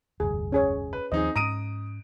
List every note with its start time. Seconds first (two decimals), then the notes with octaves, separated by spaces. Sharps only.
0.20 F1 D2 G2 G#4
0.52 C#4 G#4 C#5
0.93 B4
1.12 D#2 D#3 F3 C4 D#4 G#4 D#5
1.36 G#2 C#4 A#5 D#6 D7 D#7